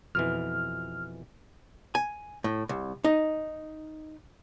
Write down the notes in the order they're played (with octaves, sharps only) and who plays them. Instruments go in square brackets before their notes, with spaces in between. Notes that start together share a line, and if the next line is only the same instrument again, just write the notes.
[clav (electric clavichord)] F2 B2 E3 [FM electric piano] F6
[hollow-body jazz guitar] G#5
A2
C2
D#4